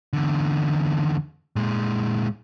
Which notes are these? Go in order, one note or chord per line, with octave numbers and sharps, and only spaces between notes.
E2 D3
A#2 G#3